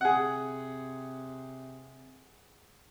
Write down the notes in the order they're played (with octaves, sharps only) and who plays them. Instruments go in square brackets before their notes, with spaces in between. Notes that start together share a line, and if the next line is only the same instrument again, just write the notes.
[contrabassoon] C3 [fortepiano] G#4 F#5